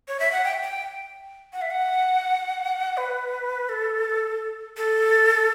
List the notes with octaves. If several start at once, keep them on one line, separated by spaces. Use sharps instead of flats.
C#5
E5
F#5
G5
G5
F#5
E5
F#5
B4
A4
A4